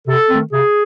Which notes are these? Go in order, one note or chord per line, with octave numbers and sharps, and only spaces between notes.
C3 A4
D#3 A3 C4
C3 G#4